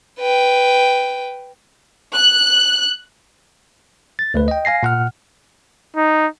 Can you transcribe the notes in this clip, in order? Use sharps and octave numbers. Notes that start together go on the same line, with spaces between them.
B4 G5
F#6
A6
D2 A3 B4
D#5 G5
F5 G#5 A#6 C7
A#2 F#5 F6
D#4